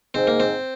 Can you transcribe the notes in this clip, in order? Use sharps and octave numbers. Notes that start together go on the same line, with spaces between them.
G#2 C4
A#3
C4